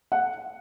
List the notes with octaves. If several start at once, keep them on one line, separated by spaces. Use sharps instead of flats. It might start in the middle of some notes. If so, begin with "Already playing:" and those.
F#5